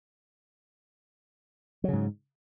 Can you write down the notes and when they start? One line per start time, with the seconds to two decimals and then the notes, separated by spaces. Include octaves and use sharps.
1.84 F#3
1.88 C#3
1.93 G#2